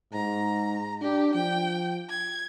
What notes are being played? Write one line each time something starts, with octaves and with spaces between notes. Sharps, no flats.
G#2 A#5
D4 G4
F3 G5
G#6